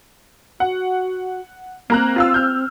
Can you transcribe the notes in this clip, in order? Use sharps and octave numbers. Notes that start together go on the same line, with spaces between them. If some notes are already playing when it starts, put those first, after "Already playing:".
F#4 F#5
A#3 C4 A#5 F#6
F4 F5 E6
F6 G6